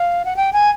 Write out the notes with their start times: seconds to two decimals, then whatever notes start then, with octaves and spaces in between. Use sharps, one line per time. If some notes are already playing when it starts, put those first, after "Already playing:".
Already playing: F5
0.25 F#5
0.36 G5
0.53 G#5